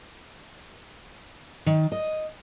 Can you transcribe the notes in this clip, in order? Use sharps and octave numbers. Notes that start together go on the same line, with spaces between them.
D#3
D#5